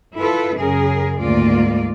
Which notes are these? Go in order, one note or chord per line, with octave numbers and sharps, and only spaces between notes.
E4 F4 A4 B4
F#2 C#3 G#4 A#4
D2 G#2 A#3 F4 D5